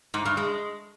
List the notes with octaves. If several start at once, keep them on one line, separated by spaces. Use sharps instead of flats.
G#2
G2
G#3